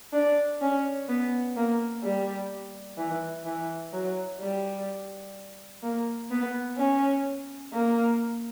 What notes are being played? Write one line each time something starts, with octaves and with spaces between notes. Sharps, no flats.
D4
C#4
B3
A#3
G3
E3
E3
F#3
G3
A#3
B3
C#4
A#3